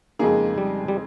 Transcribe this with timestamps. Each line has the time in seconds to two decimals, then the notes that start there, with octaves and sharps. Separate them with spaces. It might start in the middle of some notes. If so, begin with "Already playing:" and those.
0.19 F2 C#3 G#3 A#3 D#4 G#4
0.58 G3
0.88 G3